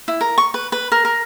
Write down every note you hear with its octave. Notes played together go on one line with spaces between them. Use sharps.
E4
A#4
C#6
B4
B4
A#4
A#4